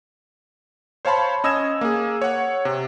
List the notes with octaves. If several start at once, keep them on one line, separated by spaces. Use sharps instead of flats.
C5 C#5 F5 A5 B5 C6
C#4 D#5 E6 G#6 E7
A#3 G#4
C#5 F#5
C3